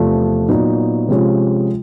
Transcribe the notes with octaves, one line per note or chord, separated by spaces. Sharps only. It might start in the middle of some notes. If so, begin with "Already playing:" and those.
Already playing: E2 C3 F3 A3
A#2 F#3 B3 D#4 F#4
C3 F3 G#3 C#4 F4